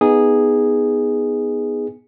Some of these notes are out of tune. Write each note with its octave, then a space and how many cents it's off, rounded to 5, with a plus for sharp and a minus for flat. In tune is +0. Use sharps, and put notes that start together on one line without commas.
B3 +0 D#4 +0 G#4 -10